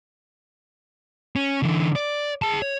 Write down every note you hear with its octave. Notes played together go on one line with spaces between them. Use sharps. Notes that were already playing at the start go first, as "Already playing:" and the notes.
C#4
D3 E3
D5
G#4 A5
C#5